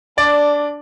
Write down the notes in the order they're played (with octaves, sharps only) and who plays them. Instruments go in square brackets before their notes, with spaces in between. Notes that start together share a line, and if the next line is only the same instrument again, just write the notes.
[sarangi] D4 [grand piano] D5